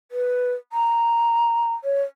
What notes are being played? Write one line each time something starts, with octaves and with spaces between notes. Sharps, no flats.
B4
A#5
C#5